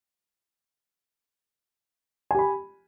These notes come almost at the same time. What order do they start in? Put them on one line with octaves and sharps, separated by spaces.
G#5 G4 B5